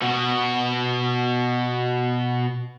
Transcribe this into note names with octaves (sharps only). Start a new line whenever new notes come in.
B2 F#4